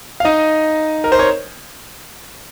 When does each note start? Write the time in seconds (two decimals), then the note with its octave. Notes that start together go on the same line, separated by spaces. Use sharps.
0.20 F5
0.25 D#4 D#5
1.04 A#4
1.12 C5
1.19 C#5